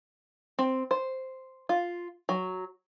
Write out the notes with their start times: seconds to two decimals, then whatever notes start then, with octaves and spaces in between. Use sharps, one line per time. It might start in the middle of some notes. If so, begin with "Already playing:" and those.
0.59 C4
0.91 C5
1.69 F4
2.29 F#3